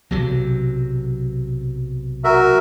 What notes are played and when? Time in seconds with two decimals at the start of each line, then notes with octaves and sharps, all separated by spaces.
0.11 B1 C3 F#3
2.24 F#4 A#4 E5